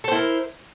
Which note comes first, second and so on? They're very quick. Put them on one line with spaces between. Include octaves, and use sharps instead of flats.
A4 C5 E4 A#4